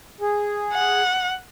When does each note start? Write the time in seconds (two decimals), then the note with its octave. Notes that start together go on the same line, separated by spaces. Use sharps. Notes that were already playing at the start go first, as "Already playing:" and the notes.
0.21 G#4
0.73 F#5